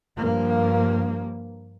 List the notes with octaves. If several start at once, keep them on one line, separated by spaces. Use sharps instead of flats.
G2 F3 A#3